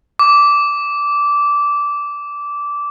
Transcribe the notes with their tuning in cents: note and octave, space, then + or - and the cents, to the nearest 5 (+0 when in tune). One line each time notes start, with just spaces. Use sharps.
D6 -15